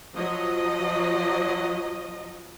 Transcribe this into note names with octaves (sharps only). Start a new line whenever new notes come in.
F3 F#3 D#5